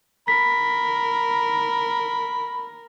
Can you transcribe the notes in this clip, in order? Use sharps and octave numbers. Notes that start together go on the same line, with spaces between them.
A#4 B5 B6